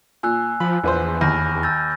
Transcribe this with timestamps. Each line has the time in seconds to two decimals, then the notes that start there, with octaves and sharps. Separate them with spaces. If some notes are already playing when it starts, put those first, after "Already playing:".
0.23 A#2 G#5 E6 F#6
0.60 F3 B5
0.83 A#1 E2 B4 C5
1.21 D#2 B5 F6 A#6
1.63 E6 G6 A6